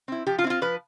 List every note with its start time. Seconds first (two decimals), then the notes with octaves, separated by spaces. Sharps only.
0.08 C4 E4
0.27 F3 G4
0.39 F4
0.44 C4 E4
0.50 F4
0.62 F3 B4